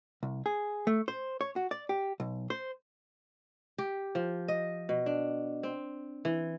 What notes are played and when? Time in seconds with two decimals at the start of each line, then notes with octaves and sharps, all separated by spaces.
0.23 C2
0.46 G#4
0.87 A3
1.08 C5
1.41 C#5
1.56 F#4
1.71 D5
1.89 G4
2.20 B1
2.50 C5
3.78 G4
4.15 F3
4.48 D#5
4.89 B2
5.06 D4
5.63 C4
6.25 E3